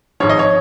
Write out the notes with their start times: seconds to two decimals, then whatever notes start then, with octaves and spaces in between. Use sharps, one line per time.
0.20 G#1 G#2 F3 C#5
0.29 D#5
0.39 C#5